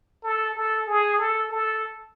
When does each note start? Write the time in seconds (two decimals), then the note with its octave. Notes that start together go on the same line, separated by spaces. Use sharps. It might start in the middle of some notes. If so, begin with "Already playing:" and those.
0.24 A4
0.55 A4
0.87 G#4
1.19 A4
1.51 A4